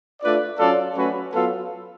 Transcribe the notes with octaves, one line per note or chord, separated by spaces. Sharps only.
A3 D4 F4 B4 D5
F#3 C#4 F4 A4 D5
F#3 A3 C#4 F#4 B4
F#3 B3 F4 A4